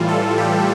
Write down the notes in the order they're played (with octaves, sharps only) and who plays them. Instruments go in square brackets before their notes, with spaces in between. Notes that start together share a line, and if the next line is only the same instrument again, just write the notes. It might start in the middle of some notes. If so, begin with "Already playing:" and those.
Already playing: [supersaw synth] A2 E3 G3 F4
A4
G4